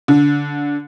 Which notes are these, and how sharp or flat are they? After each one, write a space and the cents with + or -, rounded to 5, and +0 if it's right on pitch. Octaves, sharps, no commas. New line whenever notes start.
D3 -20